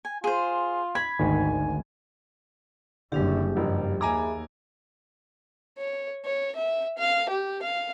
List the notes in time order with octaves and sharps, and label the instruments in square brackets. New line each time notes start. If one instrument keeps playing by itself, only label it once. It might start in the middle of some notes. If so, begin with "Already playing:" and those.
[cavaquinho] G#5
[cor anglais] F4 [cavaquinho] G#4 C5
[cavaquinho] B5 [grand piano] G#6
[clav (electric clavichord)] G#1 D2 [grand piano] D#3 [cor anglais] G#5
[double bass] F#1 F#2 [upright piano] D3 [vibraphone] G3 D4 G4
[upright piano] F#1 [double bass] G2 F3
[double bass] D#2 [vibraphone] G#4 E5 B5 [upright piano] G#5 A#5 D6
[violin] C#5
C#5
E5
F5
G4
F5